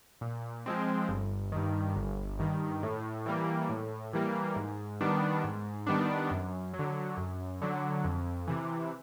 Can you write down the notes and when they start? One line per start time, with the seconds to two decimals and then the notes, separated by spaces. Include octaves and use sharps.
0.21 A#2
0.66 F3 G#3 C4
1.09 G1
1.52 G2 D#3
1.96 G1
2.39 G2 D#3
2.83 A2
3.26 E3 G3 A#3
3.70 A2
4.13 E3 G3 A#3
4.56 G#2
5.01 D#3 G3 B3 D4
5.44 G#2
5.87 D#3 G3 B3 D4
6.31 F#2
6.73 F#3
6.79 D3
7.17 F#2
7.62 D3 F#3
8.05 F2
8.47 C3 E3